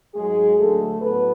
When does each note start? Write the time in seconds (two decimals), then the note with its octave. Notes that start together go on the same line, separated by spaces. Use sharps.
0.15 G#2 F#3 G#3 G#4
0.58 D2 D3 F#3 A3 A4
1.01 A2 F#3 B3 B4